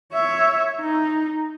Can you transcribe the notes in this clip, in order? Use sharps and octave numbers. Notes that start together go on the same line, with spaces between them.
C#5 E5
D#4